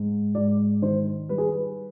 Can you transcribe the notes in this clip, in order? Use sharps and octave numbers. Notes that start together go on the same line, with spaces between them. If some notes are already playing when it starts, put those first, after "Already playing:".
Already playing: G#2
G#2 D5
D#3 C5
G3 B4
G#4
B4